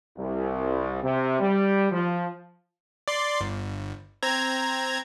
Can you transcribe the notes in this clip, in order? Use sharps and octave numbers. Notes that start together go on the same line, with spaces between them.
C2
C3
G3
F3
D5 C6
G1
C4 A#5 G#6